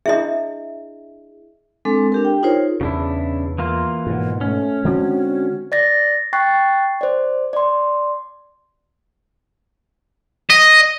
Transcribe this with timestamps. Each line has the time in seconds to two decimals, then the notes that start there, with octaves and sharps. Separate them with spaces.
0.06 D4 E4 G#4 D#5 E5
1.85 G#3 C4 D4 A4
2.12 D4 G4 A#4
2.25 G5
2.43 D#4 F4 G#4 A#4 C5 C#5
2.81 E2 C#3 D4 E4
3.58 E3 A#3 F4
4.07 G#2 B2
4.41 A3 C#4
4.85 D3 G#3 C4 F#4
5.72 D5 A6 A#6
6.33 G5 C#6 F#6 A6 C7
7.01 C5 D5
7.53 D5 C6
10.50 D#5